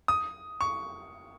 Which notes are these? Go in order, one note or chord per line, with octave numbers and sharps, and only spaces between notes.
D#6
C#6